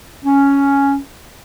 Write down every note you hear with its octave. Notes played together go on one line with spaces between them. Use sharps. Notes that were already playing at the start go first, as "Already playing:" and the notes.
C#4